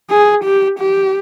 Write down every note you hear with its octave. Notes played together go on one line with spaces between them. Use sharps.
G#4
G4
G4